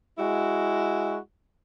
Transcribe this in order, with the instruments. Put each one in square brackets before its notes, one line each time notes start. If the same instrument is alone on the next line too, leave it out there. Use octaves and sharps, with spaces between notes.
[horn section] G#3 E4 F#4